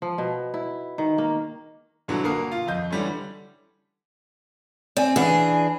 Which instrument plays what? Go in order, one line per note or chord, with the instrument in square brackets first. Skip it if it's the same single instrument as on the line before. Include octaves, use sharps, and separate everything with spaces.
[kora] F3
B2
E4
D#3
A#3
[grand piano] E2 G2 B2 D3 E3 F#3
B2 D3 A#3 A#4 D#6 C7
F4
F2 D#5 G6
D3 E3 G3 A3 C#4
[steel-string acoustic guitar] C4 [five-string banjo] D5 G#5
[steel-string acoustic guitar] E3 D4 G#4 [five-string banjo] C#4 F#5